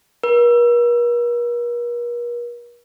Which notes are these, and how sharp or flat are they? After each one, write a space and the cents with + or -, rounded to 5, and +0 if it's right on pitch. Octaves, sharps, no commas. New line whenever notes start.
A#4 +45